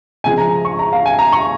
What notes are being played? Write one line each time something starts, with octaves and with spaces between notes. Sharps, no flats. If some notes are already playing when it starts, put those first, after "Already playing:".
C#3 F3 G#3 G#5
A#5
C#6
A#5
F5
G#5
A#5
C#6